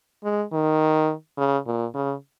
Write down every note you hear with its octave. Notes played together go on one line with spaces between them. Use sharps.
G#3
D#3
C#3
A#2
C#3